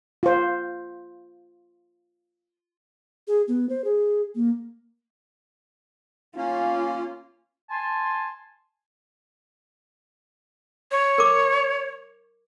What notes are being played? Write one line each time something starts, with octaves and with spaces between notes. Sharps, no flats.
F4 C5
G#4
B3
C5
G#4
A#3
A#3 C#4 F4
G#5 A5 C6
C#5
A#4 D6